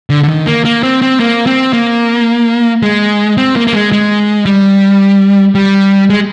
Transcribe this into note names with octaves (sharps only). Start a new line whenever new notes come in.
D3
D3
D#3
A#3
A#3
C4
C4
A#3
C4
A#3
G#3
C4
A#3
A#3
G#3
G#3
G3
G3
G#3